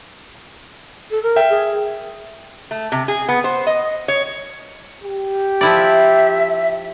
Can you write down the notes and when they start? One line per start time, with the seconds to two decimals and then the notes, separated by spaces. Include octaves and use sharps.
1.11 A4
1.23 A#4
1.36 E5 G5
1.50 G#4
2.71 A3
2.92 C3
3.08 G#4
3.29 B3
3.44 C5
3.67 D#5
4.08 C#5
5.04 G4
5.61 F3 E4 D5 E5